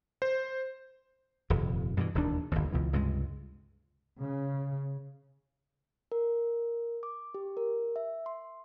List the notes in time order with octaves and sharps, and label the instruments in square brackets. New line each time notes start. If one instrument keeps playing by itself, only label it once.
[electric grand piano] C5
[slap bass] D#1 F2 C3
G2 B2 D#3 E3
E1 D#2 D#3 D4
G1 D#2
C#2 B2 E3
C#2 G2 C3 G#3
[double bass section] C#3
[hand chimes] A#4
D6
G4
A#4
E5
C6